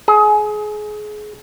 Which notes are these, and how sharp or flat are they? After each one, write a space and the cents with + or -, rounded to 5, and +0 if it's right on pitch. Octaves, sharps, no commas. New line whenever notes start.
G#4 +25